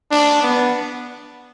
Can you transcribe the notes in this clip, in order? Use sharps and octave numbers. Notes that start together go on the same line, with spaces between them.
D4
B3